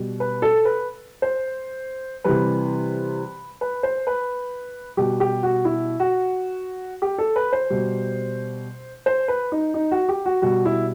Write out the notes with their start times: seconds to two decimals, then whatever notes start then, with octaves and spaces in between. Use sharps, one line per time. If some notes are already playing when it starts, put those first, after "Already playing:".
Already playing: B2 G3
0.20 B4
0.42 A4
0.65 B4
1.22 C5
2.24 C3 E3 G3 B4
3.61 B4
3.83 C5
4.07 B4
4.97 B2 G3 G4
5.20 G4
5.43 F#4
5.65 E4
6.00 F#4
7.02 G4
7.18 A4
7.36 B4
7.53 C5
7.70 B2 G3
9.06 C5
9.28 B4
9.52 D#4
9.74 D#4
9.91 F#4
10.09 G4
10.25 F#4
10.42 B2 G3 F#4
10.65 E4